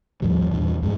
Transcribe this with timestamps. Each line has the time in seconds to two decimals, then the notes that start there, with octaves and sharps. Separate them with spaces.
0.22 D#2 A2 F3 G3
0.51 E2 G2 A#2 E3
0.82 F2 G#2 G#3